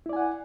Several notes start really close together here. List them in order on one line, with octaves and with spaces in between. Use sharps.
E4 D5 G#5 F#5